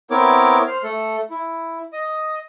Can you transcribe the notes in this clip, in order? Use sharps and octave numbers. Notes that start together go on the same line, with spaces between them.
B3 C4 E4 A#4 C#5 D6
C5 F6
A3 A4
E4
D#5 D#6